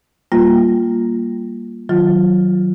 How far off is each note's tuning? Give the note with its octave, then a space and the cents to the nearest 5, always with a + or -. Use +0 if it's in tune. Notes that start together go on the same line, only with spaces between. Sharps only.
G3 +0 A#3 +0 F4 +0
D#3 +20 F#3 +0 F4 +0